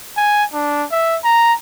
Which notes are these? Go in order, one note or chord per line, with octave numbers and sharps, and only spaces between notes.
G#5
D4
E5
A#5